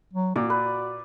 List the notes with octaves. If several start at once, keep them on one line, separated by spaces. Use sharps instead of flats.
F#3
A#2 F#4 D5
B4